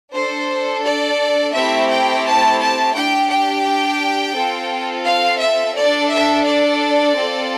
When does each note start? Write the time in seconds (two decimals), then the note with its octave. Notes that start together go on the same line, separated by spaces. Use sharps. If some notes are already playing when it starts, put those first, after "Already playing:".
0.13 D4 A4 C5
0.83 D5
1.53 A3 C4 E4 G4 E5
1.89 G5
2.25 A5
2.60 A5
2.95 D4 G4 G5
3.29 G5
4.35 C4 F4 A4
5.06 F5
5.41 E5
5.76 D4 A4 D5
6.12 E5
6.47 D5
7.17 C4 F4 A4